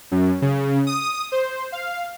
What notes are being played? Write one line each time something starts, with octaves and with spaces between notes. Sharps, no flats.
F#2
C#3
D#6
C5
F5